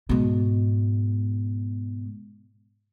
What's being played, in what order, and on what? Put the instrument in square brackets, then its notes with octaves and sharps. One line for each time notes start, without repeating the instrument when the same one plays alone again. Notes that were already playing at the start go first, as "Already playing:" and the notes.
[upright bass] G#2 B2